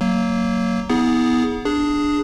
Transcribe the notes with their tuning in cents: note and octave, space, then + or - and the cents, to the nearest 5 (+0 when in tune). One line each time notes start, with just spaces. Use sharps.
F#3 +10 A#3 -10
B3 +0 E4 -45 G#4 +0
D4 +0 G#4 +0